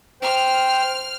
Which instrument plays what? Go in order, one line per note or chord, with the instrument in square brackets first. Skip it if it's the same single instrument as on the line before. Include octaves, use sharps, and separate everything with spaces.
[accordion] C5 G5 [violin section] F6